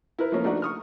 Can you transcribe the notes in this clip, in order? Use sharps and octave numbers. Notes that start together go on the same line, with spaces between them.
E4 A#4 B4
F3 A3 A#3 C#4
A3 D4 D#4 F#4 D5
C#6 D#6 F6